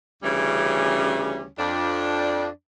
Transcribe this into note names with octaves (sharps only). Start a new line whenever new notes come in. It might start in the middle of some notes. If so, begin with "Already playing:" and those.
D2 C#3 E3 G3 C#4
F2 D4